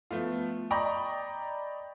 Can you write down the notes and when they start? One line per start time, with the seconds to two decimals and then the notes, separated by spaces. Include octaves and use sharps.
0.11 F3 A3 B3 F4
0.71 D5 D#5 G5 A#5 B5 C#6